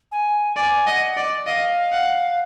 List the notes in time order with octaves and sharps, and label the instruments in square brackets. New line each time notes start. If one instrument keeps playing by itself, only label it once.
[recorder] G#5
[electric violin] D5 [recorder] G#5
[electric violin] D#5 [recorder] F#5
[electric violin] D5
[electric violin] D#5 [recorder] F5
[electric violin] F#5